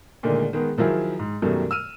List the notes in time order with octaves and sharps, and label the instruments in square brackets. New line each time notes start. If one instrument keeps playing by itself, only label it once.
[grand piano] A#2 D3 D#3 G#3 A3
D#3 G#3 B3
D#3 F3 F#3 E4 G#4
G#2
F#2 B2 D#3 F#3 G3 A3
E6 F6 D#7